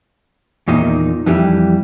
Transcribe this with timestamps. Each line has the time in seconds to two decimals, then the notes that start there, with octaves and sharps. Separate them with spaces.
0.68 E2 A#2 D#3 D#4
1.26 F2 E3 G3